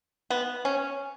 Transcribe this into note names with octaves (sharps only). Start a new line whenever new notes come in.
B3
C#4